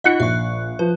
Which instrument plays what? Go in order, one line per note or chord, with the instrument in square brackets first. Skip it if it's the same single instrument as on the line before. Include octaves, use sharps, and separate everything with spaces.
[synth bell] D#4 F4 D#5 [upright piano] F#5 F#6 C#7
[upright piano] A#1 [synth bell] E5 C#6
[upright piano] F3 [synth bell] B4